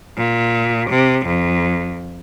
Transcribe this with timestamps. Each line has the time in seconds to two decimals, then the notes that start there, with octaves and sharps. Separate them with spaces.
0.17 A#2
0.89 C3
1.26 F2